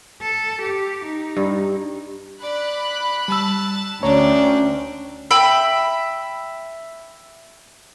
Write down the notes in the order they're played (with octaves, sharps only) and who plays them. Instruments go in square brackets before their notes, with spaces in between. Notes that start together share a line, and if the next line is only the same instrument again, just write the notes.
[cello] A4
G4
D#4
[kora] G2
[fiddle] D5 [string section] B5 F#6
[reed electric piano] G3 E6 [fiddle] A5
[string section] D2 G5 [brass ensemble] C#4 [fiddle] D4 [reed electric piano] C#5 A#5
[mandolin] E5 G5 B5